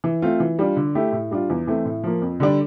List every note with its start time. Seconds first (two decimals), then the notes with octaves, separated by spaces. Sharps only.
0.04 E3
0.22 A3 C4 F4
0.40 E3
0.59 G3 D4 F4
0.77 D3
0.95 A3 E4 G4
1.12 A2
1.31 G3 D4 F4
1.50 E2
1.67 E3 A3 C4
1.85 A2
2.04 F3 A#3
2.22 F2
2.40 D3 G3 D4